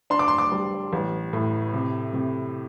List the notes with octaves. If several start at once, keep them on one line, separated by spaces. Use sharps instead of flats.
D4 C6
D6
C6
D6
G3
A1
A2
C3
C3